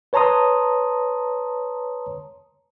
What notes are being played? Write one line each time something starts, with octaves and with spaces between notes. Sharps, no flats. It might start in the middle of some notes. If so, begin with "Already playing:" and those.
B4 C#5 A5 A#5 C6 D#6